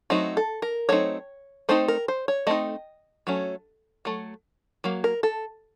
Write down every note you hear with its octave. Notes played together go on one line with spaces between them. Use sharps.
F#3 A3 C4 D#4 F#4
A4
A#4
F#3 A3 C4 D#4 C#5
A3 C4 D#4 C5
A#4
C5
C#5
A3 C4 D#4 D#5
F#3 A3 C#4
F#3 A3
F#3 A#3
A#4
A4